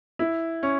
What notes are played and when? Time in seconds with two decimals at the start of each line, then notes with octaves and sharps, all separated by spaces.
0.19 E4
0.63 C#4